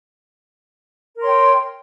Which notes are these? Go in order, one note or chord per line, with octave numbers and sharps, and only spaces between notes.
A#4 C#5 G5 C6